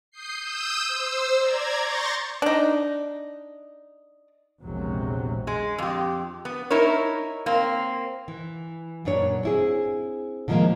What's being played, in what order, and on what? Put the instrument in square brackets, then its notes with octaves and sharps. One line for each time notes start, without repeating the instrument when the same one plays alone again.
[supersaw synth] D#6 G6 C7
D#6 E6 G6 E7
C5 E6
D5 A#5 G#6
C6 C#6 G6 A6 A#6
[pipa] D4 D#4
[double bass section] A#1 E2 C3 F#3 G#3
[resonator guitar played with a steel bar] G#3
F2 G4
B3
D#4 E4 A#4 C#5
A#3 C4
[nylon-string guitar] E3
F#2 A#2 D4 C#5
C4 E4 G#4
D3 D#3 F3 F#3 G#3 A#3